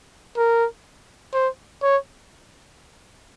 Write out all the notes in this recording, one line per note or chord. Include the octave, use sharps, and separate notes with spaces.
A#4
C5
C#5